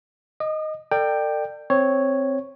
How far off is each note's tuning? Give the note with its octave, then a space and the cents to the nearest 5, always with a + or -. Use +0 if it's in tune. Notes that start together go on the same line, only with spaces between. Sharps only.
D#5 +0 D#6 -45
A4 +40 D5 +30 G5 +0
C4 +0 C#5 +0